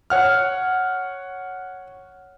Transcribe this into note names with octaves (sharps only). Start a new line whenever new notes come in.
C#5 F#5 F6